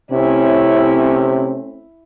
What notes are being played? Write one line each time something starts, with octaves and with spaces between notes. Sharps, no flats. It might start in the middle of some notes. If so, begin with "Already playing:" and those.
C3 A3 C4 C#4 E4